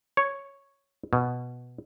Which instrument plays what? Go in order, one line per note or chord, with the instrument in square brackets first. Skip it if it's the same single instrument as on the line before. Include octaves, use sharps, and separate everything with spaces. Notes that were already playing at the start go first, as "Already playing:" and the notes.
[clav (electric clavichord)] C#5
B2